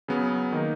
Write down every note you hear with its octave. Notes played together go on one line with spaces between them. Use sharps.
C#3 F#3 B3
D#3 A#3 D#4